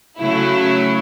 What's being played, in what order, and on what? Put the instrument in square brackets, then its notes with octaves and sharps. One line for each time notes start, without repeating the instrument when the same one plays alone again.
[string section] C#3 F#3 A3 E4